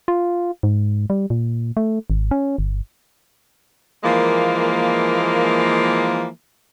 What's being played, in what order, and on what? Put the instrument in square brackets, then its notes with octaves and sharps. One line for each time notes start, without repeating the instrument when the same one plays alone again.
[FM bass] F4
G#2
G3
A#2
A3
G#1
C#4
G1
[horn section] E3 F3 G#3 A#3